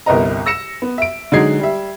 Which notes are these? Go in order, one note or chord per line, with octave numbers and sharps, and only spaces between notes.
G1 C2 A#4 B4 D#5 A#5
E6 A#6 C#7 E7
B3
E5 D7
D3 F#3 G#3 D#4 G#6 C7
G3 E5